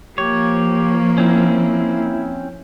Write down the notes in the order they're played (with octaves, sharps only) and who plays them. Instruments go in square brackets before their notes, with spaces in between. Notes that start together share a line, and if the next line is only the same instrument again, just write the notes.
[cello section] F3 [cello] A#3 [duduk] G4 [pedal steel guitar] C#5
[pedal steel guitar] C4 C#4 [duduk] E4